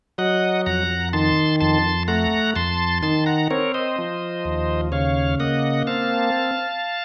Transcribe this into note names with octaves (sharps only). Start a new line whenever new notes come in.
F#3 D#5 F#5
F2 F#5 A#5
D#3 A5 C6
F2 A5 C6
A3 F#5 A#5
F2 A5 C6
D#3 A5 C6
F#5 A#5
C4 A#4 C#5
C5 D#5
F3
D#2
C#3 C#5 F5
A#3 D#5 F#5
C4 F5 A5